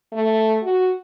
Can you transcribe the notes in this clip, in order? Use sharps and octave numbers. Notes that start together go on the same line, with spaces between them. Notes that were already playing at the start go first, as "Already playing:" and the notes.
A3
F#4